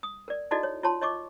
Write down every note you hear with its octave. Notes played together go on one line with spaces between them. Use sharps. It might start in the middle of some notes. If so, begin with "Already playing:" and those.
D#6
A#4 D5
D#4 E4 F#4 A4 D5 D#5
C#5
F4 C#5 A5 C6
C#5 D#5 C#6 D6